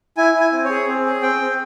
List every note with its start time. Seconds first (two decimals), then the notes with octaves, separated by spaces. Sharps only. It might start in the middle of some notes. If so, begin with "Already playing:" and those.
0.17 E4 G#5
0.34 E4
0.40 G#5
0.52 C4
0.64 C#5
0.70 G#4
0.88 C4
1.05 G#4
1.23 C4 G5
1.40 C4